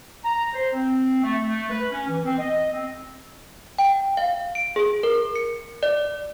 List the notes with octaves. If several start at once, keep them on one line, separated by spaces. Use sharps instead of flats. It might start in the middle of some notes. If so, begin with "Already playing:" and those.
A#5
C5
C4
A3
A3
B4
C#4
E3
C4
D#5
C4
G5
F5
D7
G#4
A#4
C#7
D5